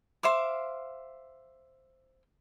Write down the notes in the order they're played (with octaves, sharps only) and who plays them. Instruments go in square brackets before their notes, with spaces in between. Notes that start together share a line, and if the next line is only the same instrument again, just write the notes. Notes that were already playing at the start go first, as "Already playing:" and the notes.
[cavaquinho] C5 E5 F5 D6